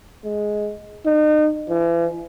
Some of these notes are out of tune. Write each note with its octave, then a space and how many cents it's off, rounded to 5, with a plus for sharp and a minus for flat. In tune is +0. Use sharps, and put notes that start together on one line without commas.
G#3 +10
D#4 -35
E3 +40